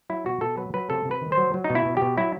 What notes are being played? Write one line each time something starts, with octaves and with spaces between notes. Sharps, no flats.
F#3 E4
B2 F#4
B2 A4
F#3 B4
F#3 B4
C3 A4
C3
B4
D#3
C5
F#3
F#3
D#4
B2
E4
B2
B2 G4
F#3 E4